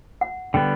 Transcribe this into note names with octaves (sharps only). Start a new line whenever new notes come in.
F#5
D3 G3 B3 G5